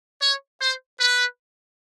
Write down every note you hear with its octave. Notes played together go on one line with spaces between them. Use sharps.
C#5
C5
B4